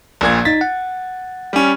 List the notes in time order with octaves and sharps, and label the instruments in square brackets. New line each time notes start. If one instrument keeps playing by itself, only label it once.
[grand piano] A#1 A#2 G#6
[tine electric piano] D#4 B6 [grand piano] A6
[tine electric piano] F#5
[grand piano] G3 C#4